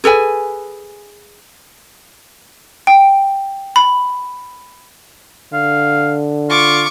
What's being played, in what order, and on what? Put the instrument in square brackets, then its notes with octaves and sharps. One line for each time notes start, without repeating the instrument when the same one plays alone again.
[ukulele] G#4 A4 B4 G#5
[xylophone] G5
B5
[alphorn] D3 [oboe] F5
[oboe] F4 [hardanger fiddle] C#6 D6